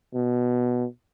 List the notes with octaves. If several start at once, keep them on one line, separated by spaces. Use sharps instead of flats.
B2